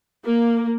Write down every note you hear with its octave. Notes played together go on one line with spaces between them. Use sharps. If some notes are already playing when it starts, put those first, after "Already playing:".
A#3